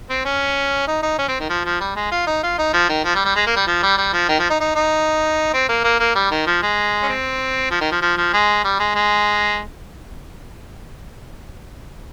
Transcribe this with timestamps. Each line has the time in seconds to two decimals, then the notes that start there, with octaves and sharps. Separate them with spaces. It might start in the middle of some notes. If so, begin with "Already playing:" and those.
0.10 C4
0.25 C#4
0.88 D#4
1.02 D#4
1.18 C#4
1.28 C4
1.40 D#3
1.49 F3
1.65 F3
1.81 G3
1.96 G#3
2.11 F4
2.27 D#4
2.43 F4
2.58 D#4
2.74 F3
2.89 D#3
3.05 F3
3.15 G3
3.25 G3
3.36 G#3
3.46 A#3
3.56 G3
3.67 F3
3.83 G3
3.98 G3
4.13 F3
4.29 D#3
4.39 F3
4.50 D#4
4.60 D#4
4.75 D#4
5.54 C4
5.69 A#3
5.84 A#3
6.00 A#3
6.15 G3
6.31 D#3
6.46 F3
6.62 G#3
7.03 C#4
7.09 C4
7.71 F3
7.81 D#3
7.91 F3
8.02 F3
8.17 F3
8.33 G#3
8.64 G3
8.79 G#3
8.95 G#3